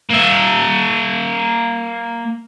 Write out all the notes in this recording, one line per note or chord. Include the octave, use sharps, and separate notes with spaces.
A#3 E5